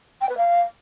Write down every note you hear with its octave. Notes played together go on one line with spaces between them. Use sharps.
G5
B4
F5